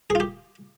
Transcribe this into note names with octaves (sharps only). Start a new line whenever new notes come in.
G#4
F4
G4